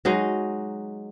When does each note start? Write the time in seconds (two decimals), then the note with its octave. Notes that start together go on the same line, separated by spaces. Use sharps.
0.05 F#3 G#3 D#4